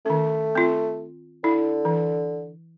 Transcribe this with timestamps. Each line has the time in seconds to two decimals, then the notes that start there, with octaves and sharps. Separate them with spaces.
0.06 D#3 A3 C#4
0.55 C4 F4
1.44 D3 E4
1.85 E3